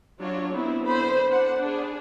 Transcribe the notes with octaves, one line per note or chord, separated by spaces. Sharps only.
F#3 D4 F4 C#5
B3 C4 E4
D3 B3 C5 B5
D4 F#5
D4 G#4